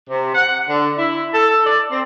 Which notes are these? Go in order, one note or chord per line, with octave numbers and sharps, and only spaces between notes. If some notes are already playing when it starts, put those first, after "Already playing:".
C3
F#5
D3
E4
A4
D5
C4